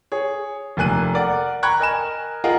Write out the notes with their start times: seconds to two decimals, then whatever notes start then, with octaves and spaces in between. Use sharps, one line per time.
0.12 G#4 C#5
0.77 F1 A#3 G#5 F#6 D#7
1.14 A#4 D5 F#5
1.63 G5 A#5 B5 C#6 F#6 G#6
1.79 A#4 D#5 G#5 E7
2.44 F4 G#4 A#4 D#5 F5 F#5